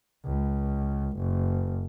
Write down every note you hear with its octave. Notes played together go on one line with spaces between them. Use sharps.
C#2
F#1